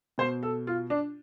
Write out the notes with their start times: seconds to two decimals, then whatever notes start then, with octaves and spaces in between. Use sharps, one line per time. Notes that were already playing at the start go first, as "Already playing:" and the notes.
0.18 B2 C5
0.43 A4
0.67 F4
0.90 D4